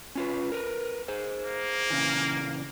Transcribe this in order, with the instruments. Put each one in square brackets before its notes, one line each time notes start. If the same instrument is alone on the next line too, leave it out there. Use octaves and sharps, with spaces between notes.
[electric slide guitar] C#4 F4 B4
A#4 B4
G#4 C5
[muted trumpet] A#3
[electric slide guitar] A#2 C#3 E3